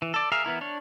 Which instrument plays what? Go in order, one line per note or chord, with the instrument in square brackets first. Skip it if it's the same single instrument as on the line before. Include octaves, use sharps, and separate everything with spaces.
[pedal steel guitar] E3
A4 D5
G#4 A#4 E5 F5
E3 B3 E4 A#4
D4 C#5